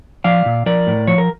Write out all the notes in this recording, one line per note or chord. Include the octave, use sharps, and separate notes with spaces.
F3 D5 F5
A#2
F3 A#4 D5
A2
F3 C#5
A#4